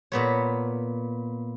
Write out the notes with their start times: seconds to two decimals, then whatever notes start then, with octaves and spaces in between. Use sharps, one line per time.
0.12 A#2 B3 C#5